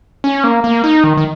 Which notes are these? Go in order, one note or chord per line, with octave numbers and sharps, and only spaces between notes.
C#4
A#3
A#3
D#4
D#3
D#3